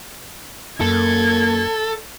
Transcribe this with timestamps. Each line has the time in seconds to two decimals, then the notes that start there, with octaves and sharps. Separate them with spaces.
0.81 F#2 A#3 A4 G#6